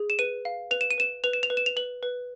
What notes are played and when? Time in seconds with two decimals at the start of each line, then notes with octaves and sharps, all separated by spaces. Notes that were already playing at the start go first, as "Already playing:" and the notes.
Already playing: G#4
0.10 E7
0.19 B4 D#7
0.45 F5
0.71 B4 F7
0.81 E7
0.91 D#7
0.98 B4 E7
1.24 B4 F7
1.33 E7
1.43 F7
1.50 B4
1.57 E7
1.66 F7
1.76 B4 F#7
2.03 B4